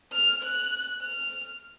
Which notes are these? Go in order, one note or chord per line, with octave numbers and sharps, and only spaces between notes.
F6
F#6
F6